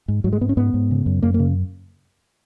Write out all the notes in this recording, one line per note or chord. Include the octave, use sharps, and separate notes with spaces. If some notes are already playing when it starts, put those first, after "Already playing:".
G#2
G#2 F#3
G#3
G#2 B3
C#4
G#2 B3
G#2
C#3
F#2
F#2 A#3
A#3
C#3